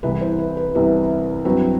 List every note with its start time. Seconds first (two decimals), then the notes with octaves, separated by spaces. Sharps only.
0.03 C2 C3 E3 B3 B4
0.21 C5
0.39 B4
0.57 B4
0.75 C2 C3 E3 B3
1.45 G2 F#3 C4 B4